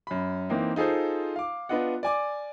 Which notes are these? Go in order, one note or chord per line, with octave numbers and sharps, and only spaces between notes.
F#2 B5
E3 A#3 C4 D#4
D#4 F4 G#4 A4 C5
F5 D6
B3 D4 F4 D#5 F#5
D5 G#5 D6